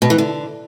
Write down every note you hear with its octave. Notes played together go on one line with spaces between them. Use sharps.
B2
E3
D3